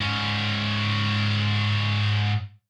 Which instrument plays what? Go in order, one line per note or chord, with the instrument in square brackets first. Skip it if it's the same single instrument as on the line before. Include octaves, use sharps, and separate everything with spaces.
[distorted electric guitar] G#2 C#4